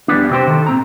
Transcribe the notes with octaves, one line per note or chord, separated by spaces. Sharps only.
E2 G3 B3 D4
C3 C4 F#4 G4 C5
D#3 A4
A#2 C4 A#5